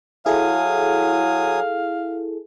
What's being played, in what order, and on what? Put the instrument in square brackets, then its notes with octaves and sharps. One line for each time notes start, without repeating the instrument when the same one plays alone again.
[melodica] F#3 G#5 D#6 [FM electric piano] E4 G#4 A4 [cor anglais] F5